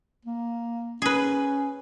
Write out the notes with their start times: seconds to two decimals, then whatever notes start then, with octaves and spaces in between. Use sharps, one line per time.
0.25 A#3
1.02 C#4 G#4 B4